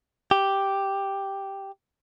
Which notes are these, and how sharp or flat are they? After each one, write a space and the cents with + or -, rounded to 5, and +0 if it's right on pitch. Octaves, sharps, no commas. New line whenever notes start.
G4 +0